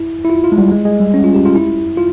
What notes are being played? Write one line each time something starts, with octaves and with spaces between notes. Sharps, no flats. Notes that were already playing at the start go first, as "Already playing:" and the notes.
Already playing: E4
E4
F4
F4
G#3
G3
G#3
G#3
G3
C#4
F4
G4
F4
E4
F4